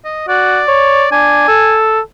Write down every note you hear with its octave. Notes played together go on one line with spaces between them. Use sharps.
D#5
F#4 D5
C#5
D4 G#5
A4